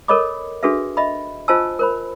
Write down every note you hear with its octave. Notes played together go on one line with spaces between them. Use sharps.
A4 A#4 C#5 D#5 B5 D6
D4 F#4 G#4 A4 B4 E5
D#5 E5 B5
F4 C5 D#5 G#5 A5 E6
A#4 C5 B5